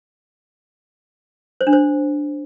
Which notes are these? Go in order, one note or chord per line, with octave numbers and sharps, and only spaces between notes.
C5
D4
C5